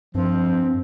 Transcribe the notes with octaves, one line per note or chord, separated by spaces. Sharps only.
G2 F3 C4